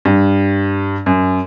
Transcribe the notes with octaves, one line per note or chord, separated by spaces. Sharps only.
G2
F#2